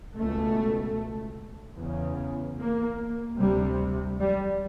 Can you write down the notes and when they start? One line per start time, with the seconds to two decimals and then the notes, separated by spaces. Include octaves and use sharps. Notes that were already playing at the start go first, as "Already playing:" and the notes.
0.16 C#2 B2 A3
1.78 E2 C#3
2.58 A#3
3.39 D2 C3 G3
4.19 G3